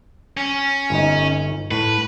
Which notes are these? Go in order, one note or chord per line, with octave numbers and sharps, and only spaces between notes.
C#4
G1 D#4
A2 B4